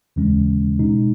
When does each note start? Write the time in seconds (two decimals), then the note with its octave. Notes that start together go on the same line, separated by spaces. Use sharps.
0.16 D#2 C#3 E3 G#3 C#4
0.79 B2 G#3 D#4